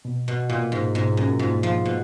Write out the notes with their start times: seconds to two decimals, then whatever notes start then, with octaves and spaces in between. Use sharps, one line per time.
0.05 B2
0.28 B2
0.49 A#2 A#3 F4
0.72 G#2
0.95 G#2 B2
1.17 F#2
1.39 G#2 A#3 F4
1.63 F3
1.86 B2